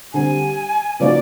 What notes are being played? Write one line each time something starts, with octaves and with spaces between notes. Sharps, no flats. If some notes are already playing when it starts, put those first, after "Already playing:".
D3 G3 C4 G#5
C#3 F3 A#3 D#4 F#4 D5